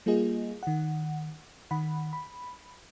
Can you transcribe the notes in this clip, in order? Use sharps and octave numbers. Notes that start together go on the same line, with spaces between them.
G3 A#3 F4 G#4 D#5
D#3 F#5
D#3 F#5 B5
B5